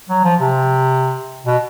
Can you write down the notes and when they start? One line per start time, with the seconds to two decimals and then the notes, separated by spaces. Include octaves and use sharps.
0.09 F#3
0.24 F3
0.40 C3
1.46 B2